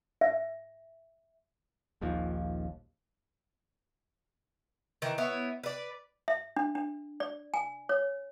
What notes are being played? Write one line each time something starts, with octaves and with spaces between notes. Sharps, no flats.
E5
D#1 A#1 D#2 F3
D#3 E3
B3 E4 C#5
B4 D5
E5
D4
D4
D5
G#5
C#5